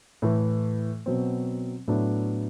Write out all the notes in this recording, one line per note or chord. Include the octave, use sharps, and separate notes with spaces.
A2 E3 A3
B2 F#3 C4
A2 F#3 B3 D4